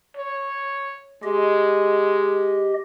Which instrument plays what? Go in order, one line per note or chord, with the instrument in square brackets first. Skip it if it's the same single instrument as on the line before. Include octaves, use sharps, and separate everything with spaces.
[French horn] C#5
[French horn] G#3 [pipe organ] G4 D#5